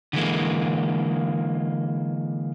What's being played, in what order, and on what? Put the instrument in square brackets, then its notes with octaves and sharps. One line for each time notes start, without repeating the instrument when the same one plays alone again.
[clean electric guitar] D3 E3 G#3 A#3